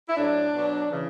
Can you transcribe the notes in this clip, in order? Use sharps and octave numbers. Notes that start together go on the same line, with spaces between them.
E4
A2 F#3 D4
B2 F#3
C#3 E3